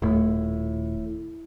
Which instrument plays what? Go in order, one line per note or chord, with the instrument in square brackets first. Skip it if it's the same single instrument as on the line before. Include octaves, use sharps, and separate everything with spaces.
[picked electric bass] D#1 [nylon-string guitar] A2